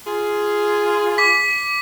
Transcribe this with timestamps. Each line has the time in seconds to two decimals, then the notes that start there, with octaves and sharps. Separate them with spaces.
0.07 F4 G#4
1.18 D6 B6